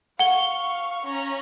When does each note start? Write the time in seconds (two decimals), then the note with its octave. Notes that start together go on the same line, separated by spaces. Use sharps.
0.19 F5 F#5 C#6 G7
1.05 C#4 A#5